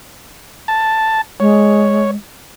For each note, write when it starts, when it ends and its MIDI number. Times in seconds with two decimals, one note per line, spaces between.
0.68 1.21 81
1.40 2.15 56
1.40 2.11 73